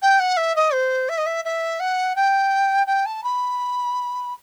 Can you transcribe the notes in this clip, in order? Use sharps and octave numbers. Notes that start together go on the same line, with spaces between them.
G5
F#5
E5
D#5
C5
E5
D#5
E5
E5
F#5
G5
G5
A5
B5